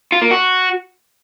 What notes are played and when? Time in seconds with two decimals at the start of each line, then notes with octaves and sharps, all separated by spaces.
0.12 F4
0.21 A#3
0.31 F#4